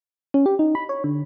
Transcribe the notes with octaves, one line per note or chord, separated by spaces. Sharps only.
C#4
G4
D#4
B5
C#5
D3